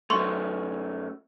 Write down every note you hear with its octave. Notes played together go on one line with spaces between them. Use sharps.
F#2 A3 C6 C#6